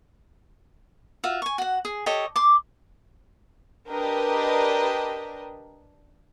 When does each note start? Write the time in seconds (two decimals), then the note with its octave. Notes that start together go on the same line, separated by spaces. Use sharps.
1.24 F4 F#4 E5
1.42 G#5 C#6
1.58 F#4 F#5
1.85 G#4
2.06 G4 A4 C#5 D#5
2.36 C6 D6
3.90 D4 G4 A#4 B4 D#5